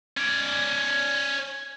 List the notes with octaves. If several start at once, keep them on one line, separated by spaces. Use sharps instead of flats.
C#4 D5